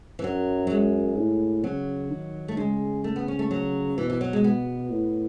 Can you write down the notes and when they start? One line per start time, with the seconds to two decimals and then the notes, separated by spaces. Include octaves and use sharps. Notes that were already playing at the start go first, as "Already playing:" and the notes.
0.19 E3
0.23 F#2 F#3
0.67 F#3
0.71 G#3
1.17 A2
1.64 C#3 F#3
2.10 D#3
2.48 A3
2.57 C#3 G#3
3.04 A3
3.16 B3
3.28 C#4
3.39 A3
3.51 F#3
3.98 B2 E3
4.10 E3
4.21 F#3
4.33 G#3
4.44 B3
4.92 A2